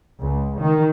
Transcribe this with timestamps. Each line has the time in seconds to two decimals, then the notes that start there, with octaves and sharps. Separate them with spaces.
0.20 C#2
0.59 D#3